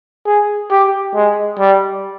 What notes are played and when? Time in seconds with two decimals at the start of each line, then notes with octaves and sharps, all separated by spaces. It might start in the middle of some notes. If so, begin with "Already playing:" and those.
0.26 G#4
0.71 G4
1.15 G#3
1.59 G3